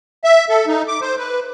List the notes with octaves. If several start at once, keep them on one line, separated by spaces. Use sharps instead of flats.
E5
A4
D#4
D6
C5
B4